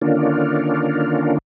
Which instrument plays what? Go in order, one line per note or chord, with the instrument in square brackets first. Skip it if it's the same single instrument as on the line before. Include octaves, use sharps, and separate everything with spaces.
[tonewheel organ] D3 D#3 A#3 C#4 D4 F4